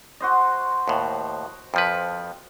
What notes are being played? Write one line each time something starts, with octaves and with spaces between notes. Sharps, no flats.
F#4 C5 D#5
D#2 A2
F2 F3 B4